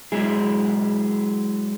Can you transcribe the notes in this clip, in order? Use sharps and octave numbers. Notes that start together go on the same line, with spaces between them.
F#3 G#3 E4 G#4